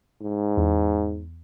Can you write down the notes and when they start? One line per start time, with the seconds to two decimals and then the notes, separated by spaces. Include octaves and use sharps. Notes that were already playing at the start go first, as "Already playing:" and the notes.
0.22 G#2
0.57 E2